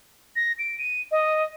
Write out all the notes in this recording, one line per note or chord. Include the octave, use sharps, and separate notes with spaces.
A#6
D7
D#7
D#5